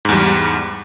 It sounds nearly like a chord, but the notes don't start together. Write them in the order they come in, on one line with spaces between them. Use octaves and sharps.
G#2 E2 G3